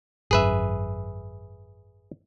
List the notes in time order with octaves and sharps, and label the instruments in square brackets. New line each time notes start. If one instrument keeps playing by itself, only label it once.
[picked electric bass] G#1 F#2 [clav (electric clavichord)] G#4 B4 E5